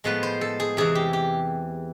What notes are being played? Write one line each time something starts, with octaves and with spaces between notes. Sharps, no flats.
A2 F3 G#3 B3 B4
C5
A4
G#4
E2 C3 E3 G#4
G4
G4